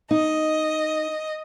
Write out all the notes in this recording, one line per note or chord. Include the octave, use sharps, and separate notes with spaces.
D#4 D#5